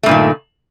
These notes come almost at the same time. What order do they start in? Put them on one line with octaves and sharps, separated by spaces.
A3 G2 A#2 D#3